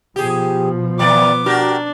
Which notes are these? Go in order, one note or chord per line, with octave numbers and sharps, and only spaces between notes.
B2 F3 G4 G#4
D#2 A#3 B3 D5 D6
D4 F#4 G4 A#4